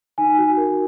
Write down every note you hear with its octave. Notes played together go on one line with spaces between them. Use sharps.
D#4 G#5
F#4
A#4